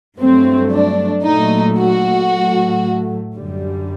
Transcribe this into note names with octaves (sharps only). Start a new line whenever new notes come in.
G2 F#3 A3 C4
D4
A#2 F#3 A3 D#4
F#4
A2 F#3 A3
F#2 D3 G3